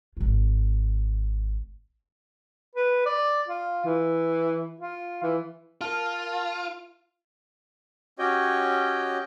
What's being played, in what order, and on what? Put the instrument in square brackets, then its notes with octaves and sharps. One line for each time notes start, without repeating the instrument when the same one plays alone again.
[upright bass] G#1 F4
[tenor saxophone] B4
D5
F4
E3
F4
E3
[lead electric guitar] F4 [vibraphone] A#4 A5 [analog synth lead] F6
[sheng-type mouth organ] C#4 F#4 G4 C#5 D#5 G5